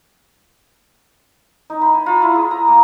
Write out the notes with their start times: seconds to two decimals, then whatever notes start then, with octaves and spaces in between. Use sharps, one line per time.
1.70 D#4
1.82 B5
1.94 G#5
2.06 F4
2.22 E4
2.36 G#4
2.51 A#5
2.67 A#3